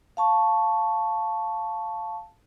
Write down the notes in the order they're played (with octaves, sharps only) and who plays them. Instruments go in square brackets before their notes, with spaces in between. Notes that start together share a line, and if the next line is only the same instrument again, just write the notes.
[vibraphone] F5 A5 C#6